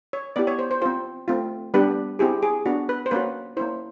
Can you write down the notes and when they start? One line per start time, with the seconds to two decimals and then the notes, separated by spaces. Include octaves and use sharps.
0.13 C#5
0.36 B3 E4 G4 D5
0.47 C#5
0.59 C5
0.71 C5
0.82 C4 F4 C5
1.28 A3 C4 F4
1.74 G3 B3 D4 G4 B4
2.19 C4 E4 G4 G#4
2.42 G#4
2.66 B3 D4 F#4
2.89 B4
3.06 C5
3.11 A#3 C#4 F#4 B4
3.57 A#3 C#4 E4 C5